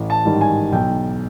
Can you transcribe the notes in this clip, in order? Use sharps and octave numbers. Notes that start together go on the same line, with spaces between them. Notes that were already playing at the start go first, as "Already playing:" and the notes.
Already playing: A1
A5
G#2 D#3 G3
G#5
B1 G5